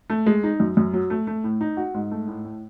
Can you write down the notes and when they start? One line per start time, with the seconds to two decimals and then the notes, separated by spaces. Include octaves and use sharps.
0.10 A3
0.26 G#3
0.44 D#4
0.60 F#2
0.77 F#2
0.93 F#3
1.10 A3
1.27 A3
1.44 A2
1.61 D#4
1.77 F#4
1.94 G#2
2.11 A3
2.28 A2
2.45 A2